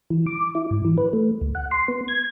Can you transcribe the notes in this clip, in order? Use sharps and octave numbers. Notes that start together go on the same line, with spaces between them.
E3
D6
E4
G#2
E3
B4
A3
D2
F#5
C6
B3
G#6